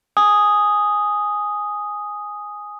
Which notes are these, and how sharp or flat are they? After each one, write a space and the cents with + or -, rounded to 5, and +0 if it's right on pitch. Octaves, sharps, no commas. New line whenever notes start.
G#5 +0 D#6 +0